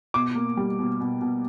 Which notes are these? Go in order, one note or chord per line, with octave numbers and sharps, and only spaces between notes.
B2 D6
A#3
G3
B2
B2
B2